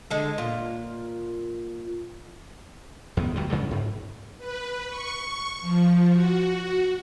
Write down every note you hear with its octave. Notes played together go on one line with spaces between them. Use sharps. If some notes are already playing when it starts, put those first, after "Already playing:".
D3 G#3 A4
A#2 F4
E2 D#3 B3
C#2 F#3 G3
G2 C#3 F#3 G3
G#2
B4
C#6
F3
F#4